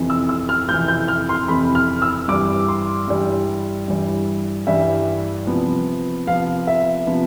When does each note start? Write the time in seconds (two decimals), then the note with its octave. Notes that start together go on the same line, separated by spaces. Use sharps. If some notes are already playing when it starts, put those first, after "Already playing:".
Already playing: F2 C3 E3
0.10 E6
0.29 E6
0.49 F6
0.69 F2 C3 E3 G6
0.88 G6
1.08 F6
1.29 C6
1.48 F2 C3 E3 B5
1.75 F6
2.02 E6
2.28 G2 E3 G3 D6
2.69 C6
3.08 G2 E3 G3
3.88 G2 E3 G3
4.67 G2 E3 G3 E5
5.47 C3 F3 B3
6.27 C3 F3 B3 F5
6.67 E5
7.07 C3 F3 B3